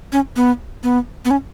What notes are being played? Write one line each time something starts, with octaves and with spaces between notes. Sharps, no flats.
C#4
B3
B3
B3
C#4